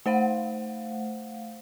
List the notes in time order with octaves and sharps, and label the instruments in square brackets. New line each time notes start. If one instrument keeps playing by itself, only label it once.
[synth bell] A3 C5 F5 F#5